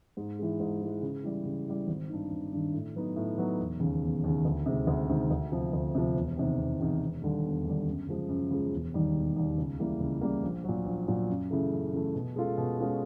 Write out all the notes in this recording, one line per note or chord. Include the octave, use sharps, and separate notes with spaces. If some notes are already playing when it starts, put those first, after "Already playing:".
G#2
E3 G#3
G#2
E3 G#3
C#3
E3 G3
C#3
E3 G3
G#1
G2 D#3
G#1
G2 D#3
A2
F#3 B3 D#4
A2
F#3 B3 D#4
E1
D#2 C#3
E1
D#2 C#3
D2
C3 D#3 G#3
D2
C3 D#3 G#3
D2
C3 F3
D2
C3 F3
E1
E2 C3 D#3
E1
E2 C3 D#3
E1
D#2 D3 G3
E1
D#2 D3 G3
F#2
C#3 F3 G#3
F#2
C#3 F3 G#3
E1
D#2 D#3 G3
E1
D#2 D#3 G3
C#2
C#3 E3 G3 A#3
C#2
C#3 E3 G3 A#3
A#1
A#2 F#3
A#1
A#2 F#3
F#2
C#3 E3 A3
F#2
C#3 E3 A3
B2
G#3 C#4 F4 A4
B2
G#3 C#4 F4 A4